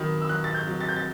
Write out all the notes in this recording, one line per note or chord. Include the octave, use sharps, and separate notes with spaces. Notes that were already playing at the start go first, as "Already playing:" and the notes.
Already playing: D#3 F#3 B5 D#6
E6
F#3 F#6
A6
G6
F#3
A6
G6
A6